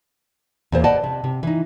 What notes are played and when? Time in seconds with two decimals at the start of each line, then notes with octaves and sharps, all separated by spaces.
0.72 E2 A#2 C5
0.84 B4 D5 D#5 F#5 A5
1.04 C3
1.24 C3
1.43 E3 D#4